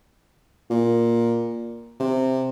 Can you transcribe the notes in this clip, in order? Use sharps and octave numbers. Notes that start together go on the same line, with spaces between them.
A#2
C3